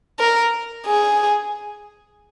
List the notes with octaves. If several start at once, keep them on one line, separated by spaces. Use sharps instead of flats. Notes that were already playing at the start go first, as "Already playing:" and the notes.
A#4
G#4